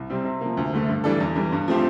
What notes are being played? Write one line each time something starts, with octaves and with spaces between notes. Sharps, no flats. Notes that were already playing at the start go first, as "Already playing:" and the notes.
Already playing: C2
C3 G3 C4
C3
F3 A#3
D2
D3 A3
G2
E3 G3 D4 A4
E2
E3 G3
G2
F3 A3 C4 G4